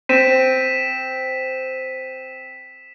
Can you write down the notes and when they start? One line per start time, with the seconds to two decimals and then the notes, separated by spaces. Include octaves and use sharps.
0.09 C4 B6 D#7 E7